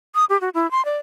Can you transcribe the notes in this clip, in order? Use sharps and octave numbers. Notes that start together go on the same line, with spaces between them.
D#6
G4
F#4
E4
C6
D5